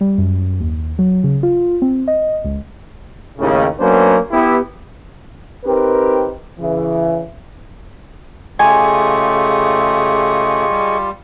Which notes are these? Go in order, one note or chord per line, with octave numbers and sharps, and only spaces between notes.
G3
F#2
D#2
F#3
C#3
F4
C4
D#5
C#2
D#2 A2 C#3
F#3 A#3 B3 C#4 D4 C5
B3 E4 G4
C4 D#4 G4 A#4 B4
C#3 E3
C#3 A3 F4 G4 G#4 D#5 G#5 C#6
G3